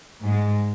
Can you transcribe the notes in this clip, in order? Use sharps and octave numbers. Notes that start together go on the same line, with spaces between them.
G#2 G#3